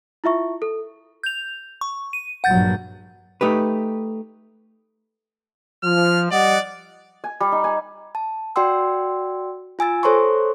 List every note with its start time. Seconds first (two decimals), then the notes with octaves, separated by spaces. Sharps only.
0.24 E4 F4 E5 C#6
0.62 A4
1.23 G6 F7
1.81 C#6
2.13 D#7
2.44 A#1 G2 F#3 F#5 G6 A6
3.41 A3 D#4 G4 B4
5.84 F3 F6
6.31 G3 D5 D#5 F#5
7.24 G#5
7.40 G3
7.52 D#4
7.64 G#5
8.15 A5
8.56 F#4 D5 G5 C6 E6
9.79 F4 G#5 E6 A6
10.03 A4 C5 C#5 A#5 C6 C#6